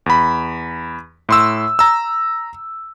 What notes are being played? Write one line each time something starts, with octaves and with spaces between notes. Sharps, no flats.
E2 B5
A2 C6 E6
A#5 E6